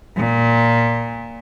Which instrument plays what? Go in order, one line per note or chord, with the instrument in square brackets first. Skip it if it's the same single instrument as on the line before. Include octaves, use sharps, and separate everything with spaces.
[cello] A#2